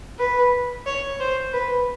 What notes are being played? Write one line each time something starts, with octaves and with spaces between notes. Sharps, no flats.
B4
C#5
C5
B4